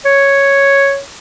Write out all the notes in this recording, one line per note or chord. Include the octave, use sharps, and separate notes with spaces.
C#5